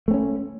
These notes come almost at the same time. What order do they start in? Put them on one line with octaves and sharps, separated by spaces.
A3 C4 C#4